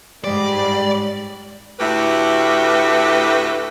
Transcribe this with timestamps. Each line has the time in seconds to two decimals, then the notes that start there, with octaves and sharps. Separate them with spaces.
0.24 G#2 G3 D5
1.80 D2 A2 F#4 G4 B4 E5